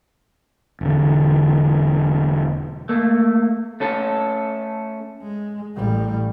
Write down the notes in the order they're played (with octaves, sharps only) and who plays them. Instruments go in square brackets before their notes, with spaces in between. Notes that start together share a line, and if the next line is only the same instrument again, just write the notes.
[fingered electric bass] E1 D3
[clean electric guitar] A3 A#3
A3 C#4 A4
[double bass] G#3
A1 G3